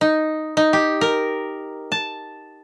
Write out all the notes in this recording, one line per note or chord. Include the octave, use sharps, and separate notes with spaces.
D#4
D#4
G4
A#4
A5